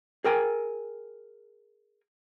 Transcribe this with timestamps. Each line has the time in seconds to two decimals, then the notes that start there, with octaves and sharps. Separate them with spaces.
0.24 G#4 A#4 G5 G#5